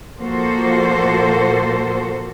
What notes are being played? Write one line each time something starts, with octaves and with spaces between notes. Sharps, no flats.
A#2 F3 A#3 F#4 A4 C5